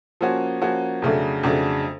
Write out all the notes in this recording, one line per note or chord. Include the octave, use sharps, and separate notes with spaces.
F3 A#3 C#4 F#4
F3 A#3 C#4 F#4
F2 C#3 F#3 A3 D4
F2 C#3 F#3 A3 D4